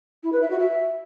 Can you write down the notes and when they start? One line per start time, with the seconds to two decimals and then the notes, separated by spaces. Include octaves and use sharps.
0.23 E4
0.32 B4
0.41 E5
0.50 F#4
0.60 E5